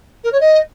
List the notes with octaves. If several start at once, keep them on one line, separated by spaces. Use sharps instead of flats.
A#4
C#5
D#5